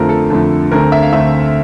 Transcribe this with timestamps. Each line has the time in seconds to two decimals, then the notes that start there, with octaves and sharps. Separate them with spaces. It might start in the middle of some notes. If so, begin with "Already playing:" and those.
Already playing: F2 D3 F3 A3 A#4
0.09 A4
0.30 F2 D3 F3 A3
0.71 D2 D3 A3 C4 A#4
0.92 E5
1.02 F5
1.13 D2 D3 A3 C4 E5